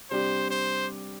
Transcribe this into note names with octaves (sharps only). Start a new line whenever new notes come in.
C3 G3 D4 G4 C5
C5